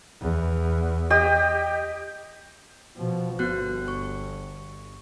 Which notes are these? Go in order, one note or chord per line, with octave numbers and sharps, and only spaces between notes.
E2
G4 D#5
B2 F3
G1 B3 F#4 F#6
C#6